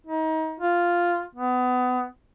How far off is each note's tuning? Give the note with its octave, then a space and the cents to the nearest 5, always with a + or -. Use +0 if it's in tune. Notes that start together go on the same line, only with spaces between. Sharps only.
D#4 +30
F4 +0
B3 +25